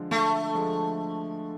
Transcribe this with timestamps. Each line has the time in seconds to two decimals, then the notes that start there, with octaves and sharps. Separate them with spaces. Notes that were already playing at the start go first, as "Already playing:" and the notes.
Already playing: D3 F3 G#3
0.11 D3 A3
0.55 F3 G#3